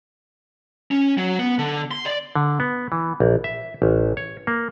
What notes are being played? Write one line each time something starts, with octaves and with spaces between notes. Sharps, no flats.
C#4
F#3
B3
D3
C6
D5
D3
B3
E3
A#1
E5
A1
C#5
A#3